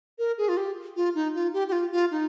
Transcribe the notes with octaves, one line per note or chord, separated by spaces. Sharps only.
A#4
G#4
F4
G4
F4
D#4
F4
G4
G4
F4
F4
D#4